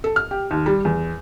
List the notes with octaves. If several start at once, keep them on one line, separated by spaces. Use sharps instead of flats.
A4
F6
G4
D#2
G3
E2